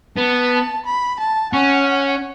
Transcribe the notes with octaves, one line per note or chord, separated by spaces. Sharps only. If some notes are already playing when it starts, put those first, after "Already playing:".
B3 A5
B5
A5
C#4 F#5